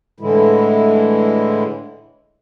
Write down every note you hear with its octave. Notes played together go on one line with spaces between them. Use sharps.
A2 D3 E3 G#3 E4